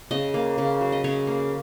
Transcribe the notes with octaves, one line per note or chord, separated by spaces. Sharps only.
C#3 D#5
A#3
C#3
F#3
D#5
C#3 C#5
A#3